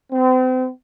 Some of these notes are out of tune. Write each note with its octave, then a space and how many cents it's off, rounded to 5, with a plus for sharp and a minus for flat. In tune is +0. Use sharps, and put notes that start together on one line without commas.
C4 -35